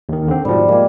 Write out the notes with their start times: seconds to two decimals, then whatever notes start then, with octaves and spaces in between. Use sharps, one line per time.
0.09 D#2 D#3
0.28 D3 C4
0.45 G#2 B2 F3 G3
0.69 G#3 A#3 G#4